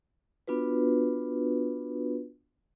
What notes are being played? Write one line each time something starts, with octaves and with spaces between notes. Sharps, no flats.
B3 D4 F4 F#4 B4